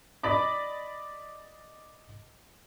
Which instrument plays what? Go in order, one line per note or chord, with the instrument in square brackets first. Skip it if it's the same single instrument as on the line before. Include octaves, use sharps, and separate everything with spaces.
[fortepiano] D5 D#5 B5 D6